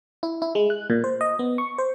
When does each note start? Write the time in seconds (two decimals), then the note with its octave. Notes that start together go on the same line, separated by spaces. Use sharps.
0.23 E4
0.42 E4
0.55 G#3
0.70 F#6
0.90 A#2
1.04 C5
1.21 D#5
1.39 B3
1.58 C#6
1.78 C5